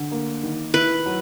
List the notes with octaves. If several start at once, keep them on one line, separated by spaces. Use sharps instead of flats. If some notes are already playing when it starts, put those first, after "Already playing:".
Already playing: D3
A#3
D#3
E4 B4
F#3